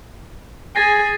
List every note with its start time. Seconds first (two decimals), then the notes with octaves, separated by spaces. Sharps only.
0.76 G#4 G#5 A6 A#6 C7